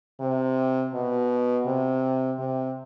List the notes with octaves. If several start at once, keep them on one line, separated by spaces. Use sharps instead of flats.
C3
B2
C3
C3